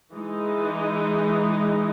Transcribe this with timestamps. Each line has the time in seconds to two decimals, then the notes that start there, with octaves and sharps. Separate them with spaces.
0.12 E3 G#3 D#4